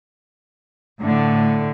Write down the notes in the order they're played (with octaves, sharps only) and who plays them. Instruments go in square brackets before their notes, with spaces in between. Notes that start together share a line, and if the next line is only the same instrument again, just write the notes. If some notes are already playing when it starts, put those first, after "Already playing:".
[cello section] A2 D3